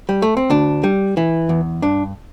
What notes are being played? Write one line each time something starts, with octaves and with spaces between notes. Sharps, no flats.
G3
A3
C4
D2 D4
G3
E3
E2
G2 D4